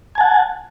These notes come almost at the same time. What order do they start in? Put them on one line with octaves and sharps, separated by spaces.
G#5 A5 F#5